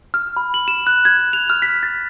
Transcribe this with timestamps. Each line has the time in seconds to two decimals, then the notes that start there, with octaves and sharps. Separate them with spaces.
0.14 F6
0.37 B5
0.54 F#7
0.68 E7
0.87 F#6
1.05 G#6
1.33 F7
1.50 F6
1.62 B6
1.83 A6